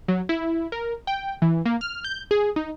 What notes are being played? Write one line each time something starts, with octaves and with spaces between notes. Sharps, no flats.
F#3
E4
A#4
G5
E3
A#3
F6
G6
G#4
D#4